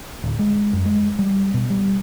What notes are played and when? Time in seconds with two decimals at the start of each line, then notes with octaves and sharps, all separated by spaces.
0.24 D1
0.39 G#3
0.73 F#2
0.85 G#3
1.19 G3
1.54 B2
1.70 G3